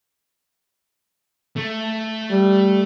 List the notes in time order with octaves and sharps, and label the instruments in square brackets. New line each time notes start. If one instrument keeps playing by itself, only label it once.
[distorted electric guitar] A3
[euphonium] G3